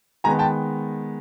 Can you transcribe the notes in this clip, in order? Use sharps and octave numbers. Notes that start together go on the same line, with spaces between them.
D#3 G#3 B3 G#5 A#5
G5 A5